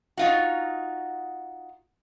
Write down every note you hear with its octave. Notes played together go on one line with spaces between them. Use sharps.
D#4 F4 F#4